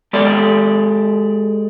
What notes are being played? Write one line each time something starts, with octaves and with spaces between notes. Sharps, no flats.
G#3 G4 A4 D5